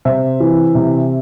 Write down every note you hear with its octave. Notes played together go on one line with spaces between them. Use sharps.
C3 C5 E5
E3
C3